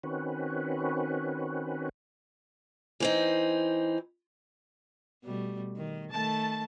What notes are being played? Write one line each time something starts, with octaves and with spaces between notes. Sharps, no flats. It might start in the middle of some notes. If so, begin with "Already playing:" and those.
D#3 C4 C#4 F#4 B4
E3 C4 D#4
B2 G3 A3
D#3
D#3 A3 A5